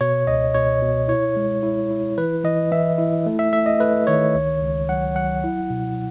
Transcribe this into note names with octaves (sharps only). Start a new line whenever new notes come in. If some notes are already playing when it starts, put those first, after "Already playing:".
B2 C#5
C#2 D#5
B2 C#5
B2
E4 C#5
G#3
E4
E4
E3 B4
E3 D#5
E3 E5
E4
A3
E5
A3 E5
D#5
A3 B4
D#3 C#5
C#2
C#2
F#3 F#5
F#3 F#5
E4
B2